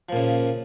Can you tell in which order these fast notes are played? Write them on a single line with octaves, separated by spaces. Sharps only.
F3 A#2 C#3